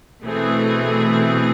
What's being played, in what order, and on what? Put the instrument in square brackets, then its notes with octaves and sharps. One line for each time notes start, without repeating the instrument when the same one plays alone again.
[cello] B2 [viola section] E3 A3 C4 G#4